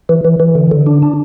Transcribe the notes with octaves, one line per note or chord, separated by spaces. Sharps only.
E3
E3
E3
D3
D3
D4
D4